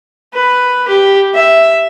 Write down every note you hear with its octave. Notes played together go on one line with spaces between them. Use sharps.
B4
G4
E5